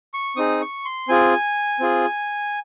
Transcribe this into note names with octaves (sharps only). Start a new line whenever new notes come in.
C#6
C4 D#4 G#4 D#6
C#6
C6
C4 F4 G#4 G#5
C4 F4 G#4